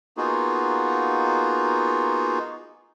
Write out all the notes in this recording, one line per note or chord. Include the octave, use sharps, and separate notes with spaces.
A#3 B3 D#4 F4 F#4 G#4